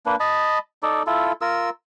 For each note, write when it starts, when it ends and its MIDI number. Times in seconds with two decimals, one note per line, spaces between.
0.06 0.16 58
0.06 0.16 62
0.06 0.16 71
0.20 0.58 75
0.20 0.58 81
0.20 0.58 83
0.83 1.02 63
0.83 1.02 69
0.83 1.02 74
1.07 1.32 64
1.07 1.32 65
1.07 1.32 69
1.41 1.70 65
1.41 1.70 70
1.41 1.70 88